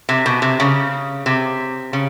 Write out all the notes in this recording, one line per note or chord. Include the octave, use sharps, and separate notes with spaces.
C3
B2
C3
C#3
C3
C#3